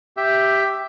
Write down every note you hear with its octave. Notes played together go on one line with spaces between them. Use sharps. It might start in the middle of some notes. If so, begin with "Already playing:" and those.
G4 E5